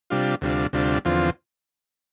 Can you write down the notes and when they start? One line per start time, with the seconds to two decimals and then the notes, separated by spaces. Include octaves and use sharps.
0.10 C3 G3 D4 F4
0.41 D2 C3 G3 D4 F4
0.73 D2 C3 G3 D4 F4
1.05 E2 D3 F3 C4 F4